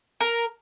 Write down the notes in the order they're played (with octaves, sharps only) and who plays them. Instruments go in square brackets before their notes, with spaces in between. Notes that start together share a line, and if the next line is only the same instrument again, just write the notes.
[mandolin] A#4